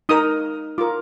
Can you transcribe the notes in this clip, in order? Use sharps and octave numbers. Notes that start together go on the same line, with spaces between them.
D#4 A#4 D#6
F4 A#4 D6